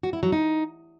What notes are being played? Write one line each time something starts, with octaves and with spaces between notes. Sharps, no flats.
F#4
E4
F#3
D#4